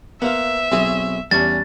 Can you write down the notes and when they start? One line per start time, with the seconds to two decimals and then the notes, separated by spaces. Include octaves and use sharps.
0.22 A#3 B3 C5 E5 F5
0.72 B1 C4 E4 G#4 C#5
1.31 E2 G3 C#4 D4 A6